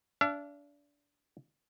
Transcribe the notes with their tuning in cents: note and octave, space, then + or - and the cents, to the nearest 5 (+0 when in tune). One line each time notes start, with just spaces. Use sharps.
D4 -25 E5 +45